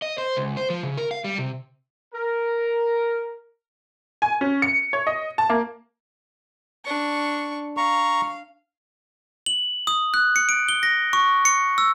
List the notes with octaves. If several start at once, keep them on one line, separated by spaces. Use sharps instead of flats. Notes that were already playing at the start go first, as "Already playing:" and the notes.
D#5
C5
C#2
C5
F3
C#3
A#4
F5
G3
C3
A#4
G#5
C#4
C#7
C#5
D#5
A5
A#3
D4 C#6
F5 A#5 C#6
F#7
D#6
F#6
C#7
D7
G7
A#6
C#6
C#7
E6